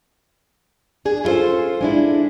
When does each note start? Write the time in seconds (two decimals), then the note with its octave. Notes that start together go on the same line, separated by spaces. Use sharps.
1.05 D4 G#4
1.24 C#4 E4 F4 A4 C5
1.81 G#3 D4 E4